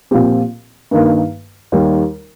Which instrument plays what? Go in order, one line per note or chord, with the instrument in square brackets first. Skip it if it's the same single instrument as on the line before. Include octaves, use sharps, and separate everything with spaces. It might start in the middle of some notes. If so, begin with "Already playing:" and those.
[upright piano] A#2 F3 C4 G4
G2 D#3 A#3
D#2 D#3 G3